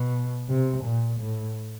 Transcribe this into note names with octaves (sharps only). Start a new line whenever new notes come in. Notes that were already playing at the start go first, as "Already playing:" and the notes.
Already playing: B2
C3
A#2
A2